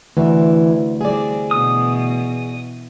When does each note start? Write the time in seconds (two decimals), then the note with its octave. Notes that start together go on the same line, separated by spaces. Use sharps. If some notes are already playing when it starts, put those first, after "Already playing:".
0.17 D2 C3 E3
1.01 G3 C4 D4 G#4 D5
1.51 B2 E3 D#6